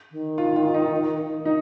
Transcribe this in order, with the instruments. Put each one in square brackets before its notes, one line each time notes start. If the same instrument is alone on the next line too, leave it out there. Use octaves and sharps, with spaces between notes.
[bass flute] D#3
[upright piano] F4
F4
D#4
[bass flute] D#3 [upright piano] D#4